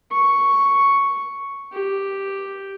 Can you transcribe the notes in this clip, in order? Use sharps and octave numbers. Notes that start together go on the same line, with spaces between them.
C#6
G4